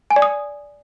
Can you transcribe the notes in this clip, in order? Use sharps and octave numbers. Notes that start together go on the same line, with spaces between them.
G#5
D5
D#6